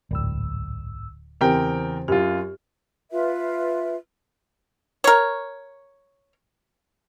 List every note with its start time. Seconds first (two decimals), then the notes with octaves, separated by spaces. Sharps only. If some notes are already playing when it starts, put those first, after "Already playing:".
0.11 D1 B1 G#2 E6
1.41 E2 C#3 C4 G4 A#4 C5 G5
2.08 F#2 F4 G4
3.12 F4 B4 E5
5.04 A#4 C#5